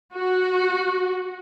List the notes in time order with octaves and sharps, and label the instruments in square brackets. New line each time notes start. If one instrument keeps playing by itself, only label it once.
[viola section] F#4